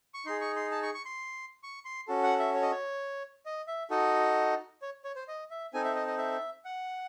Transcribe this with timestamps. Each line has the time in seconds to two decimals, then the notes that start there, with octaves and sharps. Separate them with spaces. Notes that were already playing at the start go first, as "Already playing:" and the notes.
0.14 C#6
0.25 D#4 G#4 C6
0.41 C#6
0.56 C6
0.71 A5
0.83 C#6
0.94 C#6
1.05 C6
1.63 C#6
1.85 C6
2.08 C#4 F#4 A4
2.23 F#5
2.39 E5
2.54 C#5
2.62 D#5
2.71 C#5
3.46 D#5
3.67 E5
3.90 D#4 F#4 A4 D#5
4.82 C#5
5.04 C#5
5.16 C5
5.28 D#5
5.50 E5
5.73 C4 D#4 A4 G#5
5.84 E5
5.95 D#5
6.07 D#5
6.18 E5
6.65 F#5